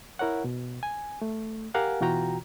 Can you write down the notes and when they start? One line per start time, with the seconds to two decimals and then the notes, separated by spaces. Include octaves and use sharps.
0.19 E4 A#4 C#5 F#5
0.44 B2
0.83 G#5
1.22 A3
1.74 G4 A#4 F5 F#5 G#5
2.01 B2 E3 F4 F#4 G5 A#5